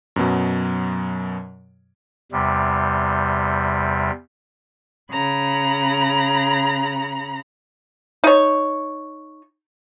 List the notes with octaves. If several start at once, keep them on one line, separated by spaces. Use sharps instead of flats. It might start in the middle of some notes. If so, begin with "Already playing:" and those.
F#2 B2 F#3
E2 C3 G3
C#3 A#5 B5
D#4 C#5